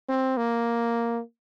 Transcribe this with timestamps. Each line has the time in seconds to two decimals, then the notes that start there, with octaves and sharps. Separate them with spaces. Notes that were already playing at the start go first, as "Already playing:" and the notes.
0.09 C4
0.37 A#3